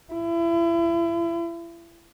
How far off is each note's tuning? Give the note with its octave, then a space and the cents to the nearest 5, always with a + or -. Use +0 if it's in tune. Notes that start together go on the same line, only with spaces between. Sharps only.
E4 +35